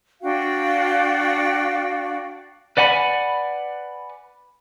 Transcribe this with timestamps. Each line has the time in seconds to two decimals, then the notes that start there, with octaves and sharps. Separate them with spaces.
0.22 D4 F#4 F5 G5
2.77 B4 D5 F#5 G#5 A#5 B5